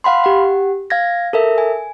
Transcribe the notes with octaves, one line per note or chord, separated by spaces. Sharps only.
F5 F#5 B5 C6
G4 F#5
F5 G#6 A#6
A4 A#4 E5
G#5